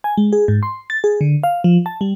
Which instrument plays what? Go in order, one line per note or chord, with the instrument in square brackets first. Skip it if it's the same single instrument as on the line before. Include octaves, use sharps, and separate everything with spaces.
[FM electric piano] G#5
G#3
G#4
G#2
C6
A6
G#4
D3
F5
F3
A5
G3